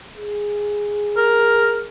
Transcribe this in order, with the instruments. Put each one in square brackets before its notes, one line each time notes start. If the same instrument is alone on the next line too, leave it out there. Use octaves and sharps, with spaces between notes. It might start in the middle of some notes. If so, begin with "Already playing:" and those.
[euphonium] G#4
[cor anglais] A#4